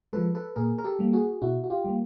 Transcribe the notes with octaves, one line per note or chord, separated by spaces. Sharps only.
F3 G#3 A4 B4
A4 B4
A#2 G#4 A#4
A#4
G4 A4
G3 A#3
F#4 G#4
B2 E4 F#4
F#4
F4 G4
G3 A#3